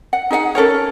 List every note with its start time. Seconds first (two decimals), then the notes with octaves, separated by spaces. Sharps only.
0.13 F#5
0.31 D#4 G#4 E5 F#5
0.55 C#4 A4 A#4 C#5